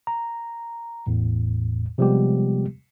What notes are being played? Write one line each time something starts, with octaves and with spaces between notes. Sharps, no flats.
A#5
G#1 E2 A2
C3 F3 G3 G#3 B3 G4